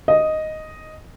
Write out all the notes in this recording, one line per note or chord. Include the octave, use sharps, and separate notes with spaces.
D#5